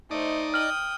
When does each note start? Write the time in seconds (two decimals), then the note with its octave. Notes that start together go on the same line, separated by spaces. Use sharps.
0.11 A3 D#4 C5 D5 D#5
0.54 G5 D#6 F6 F#7